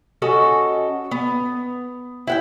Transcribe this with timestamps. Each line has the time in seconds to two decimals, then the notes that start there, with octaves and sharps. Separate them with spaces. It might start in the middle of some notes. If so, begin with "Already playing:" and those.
0.22 C#4 F#4 A4 D#5
1.11 B3
2.27 E4 F#5 G5